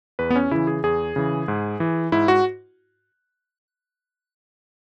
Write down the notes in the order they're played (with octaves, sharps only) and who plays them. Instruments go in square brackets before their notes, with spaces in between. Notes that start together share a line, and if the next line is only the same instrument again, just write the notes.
[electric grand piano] E2 B4
B3
C#4
C#3 E3 E4
G#4
E2 G#4
C#3 E3
G#2
E3
G#2 E4
F#4